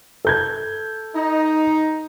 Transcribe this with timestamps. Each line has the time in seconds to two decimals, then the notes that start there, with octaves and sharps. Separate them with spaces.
0.25 A4 G6 G#6
1.15 D#4